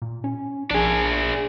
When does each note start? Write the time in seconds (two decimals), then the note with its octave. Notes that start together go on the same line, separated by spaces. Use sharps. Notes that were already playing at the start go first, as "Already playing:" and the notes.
0.02 A#2
0.24 C#4
0.71 A#1 D4 G#4